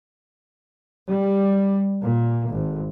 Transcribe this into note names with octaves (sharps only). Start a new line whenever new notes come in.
G3
A#2
G#1